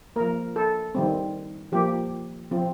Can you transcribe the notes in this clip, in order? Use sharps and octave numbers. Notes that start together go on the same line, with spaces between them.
F3 A#3 A#4
A4
D#3 G3 C4
F3 A#3 G4
F3 C4